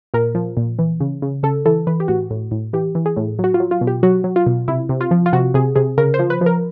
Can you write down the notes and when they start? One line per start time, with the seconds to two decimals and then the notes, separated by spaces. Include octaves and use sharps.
0.14 A#2 A#4
0.35 F3
0.57 A#2
0.79 E3
1.00 C#3
1.22 C#3
1.43 C#3 A4
1.66 E3 A4
1.87 E3 B4
2.00 G4
2.08 A2 F#4
2.31 A2
2.51 A2
2.73 E3 G4
2.95 E3
3.06 G#4
3.17 A2
3.39 F#3
3.44 F#4
3.54 F4
3.60 F#3
3.71 F4
3.81 B2
3.87 G4
4.03 F#3 F#4
4.24 F#3
4.36 F4
4.47 B2
4.68 C3 E4
4.89 C3
5.01 F4
5.11 F3
5.26 F4
5.33 C3 F#4
5.54 C3 G#4
5.76 C3 G#4
5.97 C#3 A#4
6.14 C5
6.19 F3
6.30 B4
6.41 F3
6.46 A#4